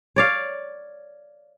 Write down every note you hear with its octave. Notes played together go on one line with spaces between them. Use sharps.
C#5 D5 F5